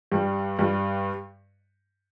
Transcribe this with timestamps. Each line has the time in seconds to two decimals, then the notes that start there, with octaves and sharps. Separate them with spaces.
0.11 G2 G3
0.59 G2 G3